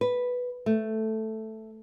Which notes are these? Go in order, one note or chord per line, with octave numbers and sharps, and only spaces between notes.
B4
A3